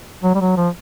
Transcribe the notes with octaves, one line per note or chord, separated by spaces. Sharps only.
F#3
G3
F#3
F3